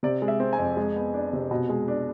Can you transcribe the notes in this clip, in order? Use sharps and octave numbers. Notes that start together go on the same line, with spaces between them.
C3 D5
G#3
E5
C4
G#5
F2
G#3
B3
D4
C3
B2
G#3
D4